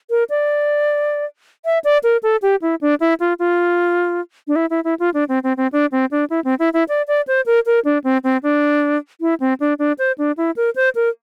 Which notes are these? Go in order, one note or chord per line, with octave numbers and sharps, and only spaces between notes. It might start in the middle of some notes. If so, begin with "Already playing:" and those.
A#4
D5
E5
D5
A#4
A4
G4
E4
D4
E4
F4
F4
D4
E4
E4
E4
F4
D4
C4
C4
C4
D4
C4
D4
E4
C4
E4
E4
D5
D5
C5
A#4
A#4
D4
C4
C4
D4
E4
C4
D4
D4
C5
D4
E4
A#4
C5
A#4